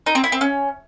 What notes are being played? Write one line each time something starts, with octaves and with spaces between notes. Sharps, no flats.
D#4
C4
E4
C4
C#4